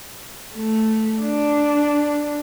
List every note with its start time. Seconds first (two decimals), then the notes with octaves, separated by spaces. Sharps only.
0.55 A3
1.21 D4